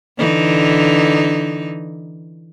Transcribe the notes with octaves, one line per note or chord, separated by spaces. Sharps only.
D3 E3 D#4